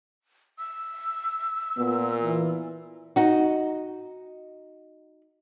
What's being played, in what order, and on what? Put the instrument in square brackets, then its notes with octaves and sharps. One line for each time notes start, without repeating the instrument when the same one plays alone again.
[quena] E6
[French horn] A#2 [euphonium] B3
[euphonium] E3
[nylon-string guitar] D#4 F#4